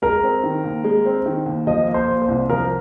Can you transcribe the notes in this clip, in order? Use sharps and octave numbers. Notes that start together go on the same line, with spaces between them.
G#3 A#4
C4
D#3
D#2
G#3
C4
D#3
D#2
F3 D#5
A#3
C5
A#2
C5
C2
F3 A#4